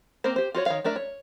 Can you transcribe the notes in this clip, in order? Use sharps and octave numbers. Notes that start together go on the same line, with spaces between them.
A#3 C4 A#4 C5
G4 C5
F4 F#4 C5 C#5
D#3 C#5 F5
A3 D4 A#4 E5
C#5